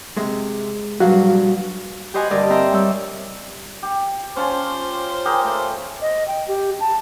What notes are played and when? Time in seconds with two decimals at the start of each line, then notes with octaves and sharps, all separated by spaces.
0.17 C3 G#3
1.00 A#1 G2 F#3 F#4 F5
2.14 G4 B4 C5 D#5 F#5 G#5
2.31 G2 D3 A#4 D5 D#5
2.50 C4 E5 G5 A#5 C6
2.73 G3 C#5 G5 E6
3.83 G4
4.37 C#4 F4 C5 A5
5.25 G4 G#4 A#4
5.44 A3 C5
6.02 D#5
6.28 G5
6.48 G4
6.80 A5